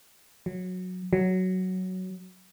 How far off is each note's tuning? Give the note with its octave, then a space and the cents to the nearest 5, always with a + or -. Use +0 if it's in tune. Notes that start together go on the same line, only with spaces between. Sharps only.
F#3 -15
F#3 +5